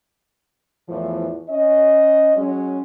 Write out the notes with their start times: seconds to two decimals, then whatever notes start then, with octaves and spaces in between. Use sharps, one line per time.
0.89 E2 A2 E3 F3
1.49 C#4 D#5
2.37 F#3 G#3 C#4